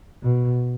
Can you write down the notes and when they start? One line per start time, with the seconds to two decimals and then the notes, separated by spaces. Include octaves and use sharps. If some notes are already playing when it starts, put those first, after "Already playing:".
0.22 B2